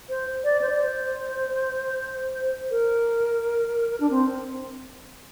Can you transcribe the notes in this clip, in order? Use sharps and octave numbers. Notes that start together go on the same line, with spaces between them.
C5
D5
C5
D5
C5
A#4
D4
C4